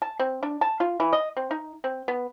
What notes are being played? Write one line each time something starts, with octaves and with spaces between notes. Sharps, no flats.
A5
C4
D4
A5
F4
E3
D#5
C4
D#4
C4
B3